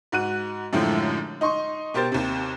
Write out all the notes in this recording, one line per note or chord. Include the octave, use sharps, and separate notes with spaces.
G#2 F#4 F#6 D#7
F#2 A2 D3 F3 G#3
D#4 D#5 C6 C#6
B2 G4 A#4 C5 A6
D#2 C3